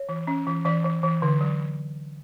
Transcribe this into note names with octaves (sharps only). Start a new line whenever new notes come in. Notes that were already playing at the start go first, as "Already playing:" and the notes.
Already playing: C#5
E3
C#4
E3
E3 D5
E3
E3
D3
F#3